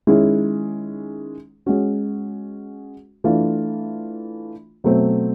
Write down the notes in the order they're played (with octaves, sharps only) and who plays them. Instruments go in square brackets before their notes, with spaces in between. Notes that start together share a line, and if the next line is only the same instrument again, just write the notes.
[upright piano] D#3 G#3 C#4 E4 G#4
G#3 C#4 F#4
E3 A3 D4 F4
B2 F#3 A3 C4